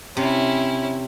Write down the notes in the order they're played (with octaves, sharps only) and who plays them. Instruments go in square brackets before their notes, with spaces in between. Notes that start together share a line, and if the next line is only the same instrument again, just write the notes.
[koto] C3 [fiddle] C#4 E4